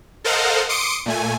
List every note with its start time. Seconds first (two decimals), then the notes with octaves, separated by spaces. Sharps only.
0.24 A4 A#4 C5 D#5 F5 F#5
0.69 C6 D6 D#6 C#7 D7
1.06 A#2 A3 G#5